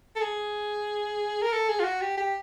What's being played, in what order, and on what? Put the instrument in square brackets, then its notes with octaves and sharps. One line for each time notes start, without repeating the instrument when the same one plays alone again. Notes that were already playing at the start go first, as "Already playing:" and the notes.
[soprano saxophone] A4
G#4
A#4
A4
G#4
F4
F#4
G4
G4